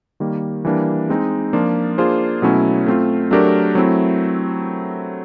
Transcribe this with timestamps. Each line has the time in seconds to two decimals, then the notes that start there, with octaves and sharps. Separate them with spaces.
0.20 D#3 G3 A#3
0.65 E3 G3 A#3 D4
1.10 G#3 C4 D#4
1.53 F3 A#3 D4 F4
1.98 A#3 D4 F4 G#4 C5
2.42 B2 F#3 A3 C#4 E4
2.86 A3 C4 F4
3.31 F#3 A3 D4 G4 A#4
3.75 F#3 A3 C4 E4